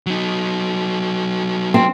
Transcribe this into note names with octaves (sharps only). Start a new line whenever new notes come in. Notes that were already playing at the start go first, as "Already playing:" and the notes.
F#3 D#4
C4